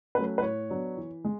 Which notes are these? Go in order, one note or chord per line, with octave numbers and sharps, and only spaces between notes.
F#3 A3 C#4 B4
B4
A2 C#5
F#3 B3 D4
E3
G#3